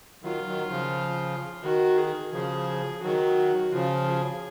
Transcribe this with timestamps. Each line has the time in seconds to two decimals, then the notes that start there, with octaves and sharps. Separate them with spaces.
0.24 D#3 F#3 F4
0.47 D#3 F#3
0.70 C#3 F3
1.63 D#3 F#4
1.98 G#4
2.33 C#3 F3 G#4
3.02 D#3 F#3 F#4
3.72 C#3 F3 F4
4.08 G#4